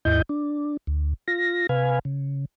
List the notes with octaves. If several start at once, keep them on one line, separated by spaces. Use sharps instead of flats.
D#2 G#2 E4 D#5 G6
D4
D2
F4 A#6
C3 B4 F5 G#5
C#3